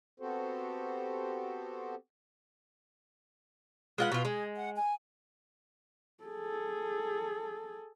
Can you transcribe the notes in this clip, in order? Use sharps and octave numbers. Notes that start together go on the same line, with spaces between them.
B3 C4 F#4 G4 A4 C5
G#3 F4 B4 F#5
B2 F4
G#3 G#4
F#5
G#5
G#4 A4